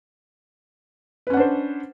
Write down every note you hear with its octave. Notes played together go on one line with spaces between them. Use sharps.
C#4 D4 B4 C5 F#5